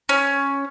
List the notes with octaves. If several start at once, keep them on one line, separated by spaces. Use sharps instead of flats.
C#4